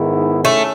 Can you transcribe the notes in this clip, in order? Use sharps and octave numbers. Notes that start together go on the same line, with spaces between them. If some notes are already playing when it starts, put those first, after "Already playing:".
Already playing: G#2 D#3 G#3 B3 E4
A3 C#4